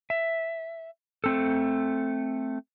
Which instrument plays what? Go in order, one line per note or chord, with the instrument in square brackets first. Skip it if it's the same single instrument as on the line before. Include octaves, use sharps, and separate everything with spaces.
[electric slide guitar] E5
A3 C4 A4